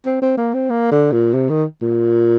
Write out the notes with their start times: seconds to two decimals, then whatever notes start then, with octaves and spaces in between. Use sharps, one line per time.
0.06 C4
0.22 C4
0.37 A#3
0.54 C4
0.70 A#3
0.91 D3
1.12 A#2
1.34 C3
1.50 D#3
1.82 A#2